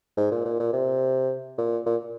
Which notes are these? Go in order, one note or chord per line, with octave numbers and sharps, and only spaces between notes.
G#2
A#2
A#2
A#2
C3
A#2
A#2